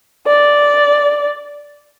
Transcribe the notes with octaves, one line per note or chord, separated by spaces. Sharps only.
D5